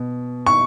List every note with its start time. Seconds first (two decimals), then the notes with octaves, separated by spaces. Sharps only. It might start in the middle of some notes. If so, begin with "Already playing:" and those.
Already playing: B2
0.47 C#6